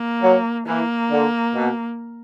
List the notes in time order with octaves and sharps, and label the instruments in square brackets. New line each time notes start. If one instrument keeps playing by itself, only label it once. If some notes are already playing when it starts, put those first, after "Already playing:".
Already playing: [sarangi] A#3
[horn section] F#3
[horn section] E3 [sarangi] A#3
[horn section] D3
B2